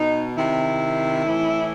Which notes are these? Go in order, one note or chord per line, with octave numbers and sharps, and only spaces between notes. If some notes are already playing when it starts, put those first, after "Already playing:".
Already playing: B2 D#4
C3 D#3 E4
A2 E3